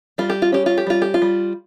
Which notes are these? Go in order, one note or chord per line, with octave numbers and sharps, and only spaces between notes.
G3 F4
G4
F4
C#4 G4
F4
G4
G3 F4
G4
F4
G3